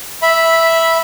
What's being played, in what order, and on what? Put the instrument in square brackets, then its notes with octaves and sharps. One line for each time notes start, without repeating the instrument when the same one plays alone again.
[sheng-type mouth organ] E5 B5